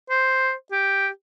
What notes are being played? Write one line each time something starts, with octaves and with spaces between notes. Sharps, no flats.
C5
G4